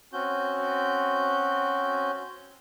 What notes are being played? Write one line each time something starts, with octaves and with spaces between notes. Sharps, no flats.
C4 C#4 F#4 G6